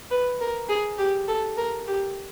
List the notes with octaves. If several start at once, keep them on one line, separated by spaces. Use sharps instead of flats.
B4
A#4
G#4
G4
A4
A#4
G4